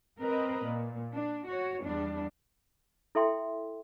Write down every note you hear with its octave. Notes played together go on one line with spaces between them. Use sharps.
C4 A#4 B4 D#5
A#2
D4
F#4 C#5
E2 G3 D4
E4 A4 E5 G5 C6